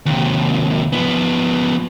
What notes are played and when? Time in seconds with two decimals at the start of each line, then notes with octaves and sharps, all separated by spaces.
0.06 D#2 C3
0.93 F3 B3